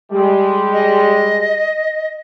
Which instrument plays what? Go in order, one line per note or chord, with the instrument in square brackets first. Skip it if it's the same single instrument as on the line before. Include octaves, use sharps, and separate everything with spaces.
[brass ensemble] G3 G#3
[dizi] D#5